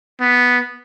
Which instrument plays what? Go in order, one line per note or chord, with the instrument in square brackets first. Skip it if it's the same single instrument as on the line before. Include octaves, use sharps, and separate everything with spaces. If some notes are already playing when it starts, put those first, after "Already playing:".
[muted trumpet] B3